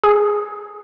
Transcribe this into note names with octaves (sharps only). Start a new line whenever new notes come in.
G#4